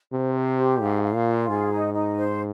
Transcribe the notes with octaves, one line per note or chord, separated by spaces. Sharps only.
C3 C5
C5
G4
G#2 F5
F5
A#2
F4
G#2 G#4
D#4
D#4
C5